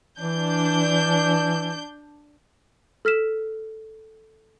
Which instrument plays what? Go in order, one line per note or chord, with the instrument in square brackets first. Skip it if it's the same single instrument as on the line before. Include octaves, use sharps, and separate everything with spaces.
[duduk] E3 [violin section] D4 G6
[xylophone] A4 F6 B6 E7